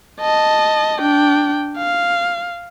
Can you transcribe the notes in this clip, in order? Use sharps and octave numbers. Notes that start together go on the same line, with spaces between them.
D#5 A5
D4 G5
F5